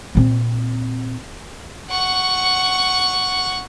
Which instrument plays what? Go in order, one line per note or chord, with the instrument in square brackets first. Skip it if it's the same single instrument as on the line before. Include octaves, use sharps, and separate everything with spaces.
[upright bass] A#2 C4
[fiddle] F#5 C#6